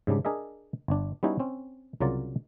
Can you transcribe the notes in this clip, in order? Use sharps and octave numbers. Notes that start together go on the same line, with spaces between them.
G#2 C#3 G3 D4
D4 G#4 A#4 D#5 E5
G1 D4
G3 B3 C#4 D#4 E4 F#4
C4 C#4
C2 C#3 F#3 F4 A#4 D5